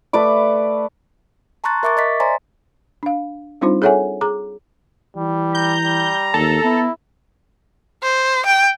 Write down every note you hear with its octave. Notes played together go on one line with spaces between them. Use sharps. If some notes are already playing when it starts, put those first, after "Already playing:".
A3 B4 D5 D6
A5 A#5 C6 C#6 F#6 A6
A#4 E5 C#6 D6 A6
D#5 A6 B6
C5 D5 E5 G#5 A#5 C6
D4 F5
G3 C4 D4 D#4 F4 C5
G#4 A4 C#5 E5 F#5 G#5
G#4 A#5 D6
E3 G3
A#5 G6
G3
D#2 A4
B3 E4
C5
G5